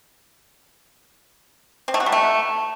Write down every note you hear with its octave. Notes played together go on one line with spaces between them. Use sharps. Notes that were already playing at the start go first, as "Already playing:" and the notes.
C4
A3
F#4
G3
A3